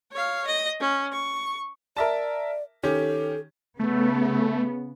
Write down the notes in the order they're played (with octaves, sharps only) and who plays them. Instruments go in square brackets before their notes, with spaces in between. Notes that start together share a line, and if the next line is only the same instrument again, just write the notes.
[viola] C#5 F5
D#5
C#4
C#6
[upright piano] A#4 E5 A5 [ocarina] D5
[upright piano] D#3 C#4 G4 [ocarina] A4
[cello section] C#3 B3 [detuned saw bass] A3